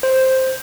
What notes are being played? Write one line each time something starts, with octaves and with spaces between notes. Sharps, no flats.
C5